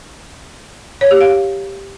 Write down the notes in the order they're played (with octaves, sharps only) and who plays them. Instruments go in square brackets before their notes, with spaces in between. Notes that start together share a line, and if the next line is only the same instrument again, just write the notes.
[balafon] C#5
G4
F5